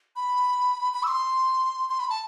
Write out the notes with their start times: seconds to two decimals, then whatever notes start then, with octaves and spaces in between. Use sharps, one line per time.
0.16 B5
0.93 B5
1.03 E6
1.08 C6
1.90 C6
1.99 B5
2.10 A5